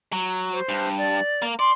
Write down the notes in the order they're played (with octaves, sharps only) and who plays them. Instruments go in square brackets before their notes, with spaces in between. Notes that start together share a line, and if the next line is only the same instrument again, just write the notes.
[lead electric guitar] F#3
[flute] C5
[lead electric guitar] G2
[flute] D5
[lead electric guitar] A#3
[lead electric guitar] D5 [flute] C6